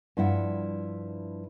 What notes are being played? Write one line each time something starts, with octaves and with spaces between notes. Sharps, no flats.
G2 F3 E4 F#5